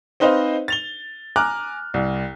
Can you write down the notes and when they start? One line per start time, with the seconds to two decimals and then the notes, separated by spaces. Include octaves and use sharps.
0.20 C4 D#4 B4 C5 D#5 F5
0.68 A6 F7 G7
1.36 G#5 A#5 D6 F6 F#6
1.94 C2